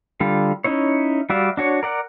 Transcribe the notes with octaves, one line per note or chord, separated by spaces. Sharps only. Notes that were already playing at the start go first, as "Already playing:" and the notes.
D3 G3 F4
C#4 D#4 E4 C#5
G3 F#4 D5 E5 F5
D4 F#4 C#5
A#4 D5 F#5